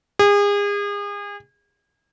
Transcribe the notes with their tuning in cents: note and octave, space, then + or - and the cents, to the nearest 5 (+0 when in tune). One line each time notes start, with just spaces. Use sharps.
G#4 -35